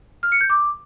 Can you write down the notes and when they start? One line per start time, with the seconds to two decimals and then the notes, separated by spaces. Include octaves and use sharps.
0.23 F6
0.32 C#7
0.41 G6
0.50 D6